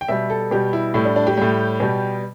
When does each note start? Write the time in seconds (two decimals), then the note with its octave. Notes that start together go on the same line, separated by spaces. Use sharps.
0.01 G5
0.08 B2 G3 E5
0.30 A4
0.51 B2 G3 G4
0.73 E4
0.94 A2 G3 E4
1.05 D4
1.16 D4
1.27 G4
1.37 A2 G3
1.80 B2 G3